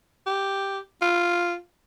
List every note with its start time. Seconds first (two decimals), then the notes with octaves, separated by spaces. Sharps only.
0.26 G4
1.02 F4